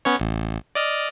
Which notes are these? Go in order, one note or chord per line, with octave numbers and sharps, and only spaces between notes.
B3 C#4 C#5
A1
D5 D#5 F6